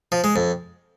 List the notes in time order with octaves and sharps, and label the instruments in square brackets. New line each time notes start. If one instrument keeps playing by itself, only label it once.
[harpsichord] F3
G#3
F2